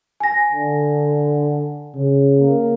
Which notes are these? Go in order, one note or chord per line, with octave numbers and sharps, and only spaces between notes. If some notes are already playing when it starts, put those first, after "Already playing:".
G#5 A#6
D3
C#3
A#3